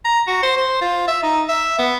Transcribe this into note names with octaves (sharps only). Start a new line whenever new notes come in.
A#5
F#4
C5
C5
F4
E5
D#4
E5
B3